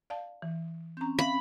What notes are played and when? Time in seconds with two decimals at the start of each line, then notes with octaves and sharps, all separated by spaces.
0.10 D5 F5 A5
0.42 E3
0.97 C4 C#4 A#5 G6
1.19 E5 F5 B5